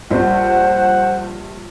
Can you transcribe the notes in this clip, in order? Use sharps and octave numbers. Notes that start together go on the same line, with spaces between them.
A#1 G2 C5 F#5